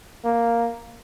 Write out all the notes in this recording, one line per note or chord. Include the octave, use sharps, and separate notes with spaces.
A#3